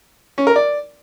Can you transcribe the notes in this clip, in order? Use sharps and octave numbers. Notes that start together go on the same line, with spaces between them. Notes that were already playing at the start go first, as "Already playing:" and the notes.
C#4
A#4
D5